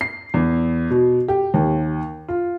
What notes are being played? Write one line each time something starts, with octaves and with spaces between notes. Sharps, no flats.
C7
E2
B2
G4
D#2
F4